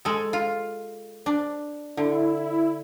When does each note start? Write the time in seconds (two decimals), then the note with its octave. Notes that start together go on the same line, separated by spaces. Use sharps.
0.05 G#3 A4
0.33 F4
1.26 D4
1.97 D3 E4